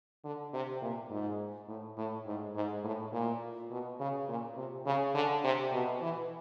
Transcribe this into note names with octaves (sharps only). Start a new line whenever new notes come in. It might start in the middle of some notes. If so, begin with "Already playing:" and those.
D3
C3
A#2
G#2
A2
A2
G#2
G#2
A2
A#2
B2
C#3
A#2
C3
C#3
D3
C3
B2
E3